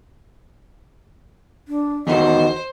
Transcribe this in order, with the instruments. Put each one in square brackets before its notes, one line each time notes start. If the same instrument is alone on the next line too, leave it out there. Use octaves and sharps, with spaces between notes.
[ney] D4
[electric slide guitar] E2 D#3 F#4 [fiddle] C5 [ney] D#5